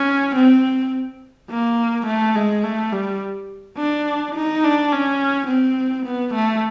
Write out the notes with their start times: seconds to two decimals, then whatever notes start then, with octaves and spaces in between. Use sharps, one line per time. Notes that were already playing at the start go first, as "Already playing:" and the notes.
Already playing: C#4
0.36 C4
1.50 A#3
2.07 A3
2.36 G#3
2.64 A3
2.93 G3
3.78 D4
4.35 D#4
4.64 D4
4.92 C#4
5.48 C4
6.06 B3
6.34 A3